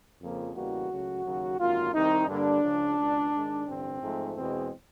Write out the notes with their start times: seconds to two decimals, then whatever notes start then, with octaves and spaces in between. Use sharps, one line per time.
0.20 F2 C#3 F3 A#3
0.55 E2 C#3 E3 G3 A#3 F#4
0.90 C#2 C#3 F#3 A3
1.24 D#2 C#3 F#3 A#3
1.58 G#1 F#2 D3 F#3 A#3 F4
1.93 C2 C3 D#3 D#4
2.27 G2 D3 G3 A#3 D4
2.62 C#2 C#3 F3
2.97 C#2 B2 G#3
3.32 G#2 D#3 G#3
3.66 A1 G2 D3 C4
4.01 G#2 F3 A3
4.35 E2 B2 G#3 C4